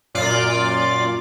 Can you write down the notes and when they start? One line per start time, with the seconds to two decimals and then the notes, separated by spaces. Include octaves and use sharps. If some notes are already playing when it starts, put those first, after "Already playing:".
0.15 F#2 A#2 F4 D5 D6